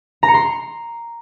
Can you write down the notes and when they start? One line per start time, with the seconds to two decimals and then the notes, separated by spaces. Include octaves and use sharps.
0.23 A#5
0.28 C#7
0.34 C6